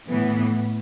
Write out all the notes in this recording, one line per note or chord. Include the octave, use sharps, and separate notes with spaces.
A2 E3 B3